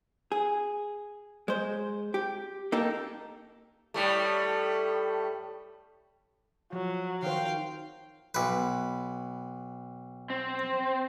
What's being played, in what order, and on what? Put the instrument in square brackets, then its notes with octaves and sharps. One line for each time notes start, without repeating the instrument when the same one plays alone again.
[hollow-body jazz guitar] G#4
G#3 C5
G4
A#3 D#4 G4 A4 A#4
[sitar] A2 G3 A3
[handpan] F3 [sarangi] F#3
[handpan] D#3 C5 [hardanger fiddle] F5 G5
[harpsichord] B1 B4
[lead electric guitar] C4